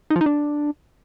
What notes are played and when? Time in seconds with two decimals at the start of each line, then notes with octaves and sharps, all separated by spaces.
0.10 D#4
0.16 F3
0.21 D#4
0.26 D4